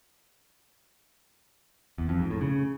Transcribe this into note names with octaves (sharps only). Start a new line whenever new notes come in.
E2
F2
G#2
A2
C#3